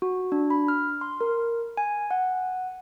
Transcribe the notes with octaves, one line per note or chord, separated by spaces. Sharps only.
F#4
D4
B5
F6
C6
A#4
G#5
F#5